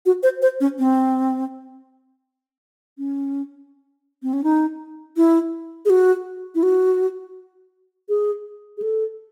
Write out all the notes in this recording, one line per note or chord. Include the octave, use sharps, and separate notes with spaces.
F#4
C5
C5
C#4
C4
C#4
C4
C#4
D#4
E4
G#4
F#4
E4
F#4
G#4
G#4
A4